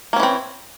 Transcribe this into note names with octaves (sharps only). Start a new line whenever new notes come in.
E3 A#3 C4 C#4